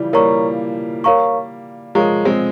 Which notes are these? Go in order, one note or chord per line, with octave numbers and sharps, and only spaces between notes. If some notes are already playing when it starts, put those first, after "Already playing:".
Already playing: C#3 E3 F3 G3
G3 A#3 A#4 C#5 F5 A#5 C#6
A#4 C#5 F5 A#5 C#6
F3 G#3 A#4 C#5 F5 A#5 C#6
G#3 C4